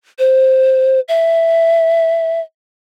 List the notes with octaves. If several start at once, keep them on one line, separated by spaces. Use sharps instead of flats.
C5
E5